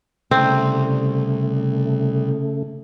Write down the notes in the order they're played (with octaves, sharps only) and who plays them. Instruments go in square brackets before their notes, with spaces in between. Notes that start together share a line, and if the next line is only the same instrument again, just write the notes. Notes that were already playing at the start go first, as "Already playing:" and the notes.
[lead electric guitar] C2 [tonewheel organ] C#3 A3 [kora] C4